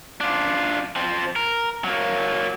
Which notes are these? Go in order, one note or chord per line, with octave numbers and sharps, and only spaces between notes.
D4 F4
F3 C4
A#4
F#3 A#3